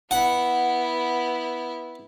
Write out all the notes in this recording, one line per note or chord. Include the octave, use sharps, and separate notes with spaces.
B3 E4 F#5